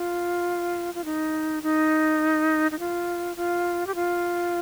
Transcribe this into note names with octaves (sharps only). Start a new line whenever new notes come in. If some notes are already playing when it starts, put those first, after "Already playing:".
Already playing: F4
F4
D#4
D#4
D#4
F4
F4
G4
F4